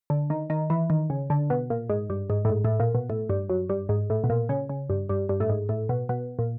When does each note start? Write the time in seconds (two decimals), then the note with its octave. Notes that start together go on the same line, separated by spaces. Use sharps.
0.10 D3
0.30 D#3
0.50 D#3
0.70 E3
0.90 D#3
1.10 C#3
1.30 D3
1.50 B2
1.70 A#2
1.90 G#2
2.10 G2
2.30 G#2
2.45 A2
2.50 G#2
2.65 A2
2.80 A#2
2.95 B2
3.10 A2
3.29 G2
3.50 F#2
3.70 G2
3.89 G#2
4.10 A2
4.24 B2
4.30 A#2
4.49 C#3
4.69 C#3
4.90 G2
5.09 G2
5.29 G2
5.40 A2
5.49 G#2
5.69 A2
5.89 B2
6.09 B2
6.39 A#2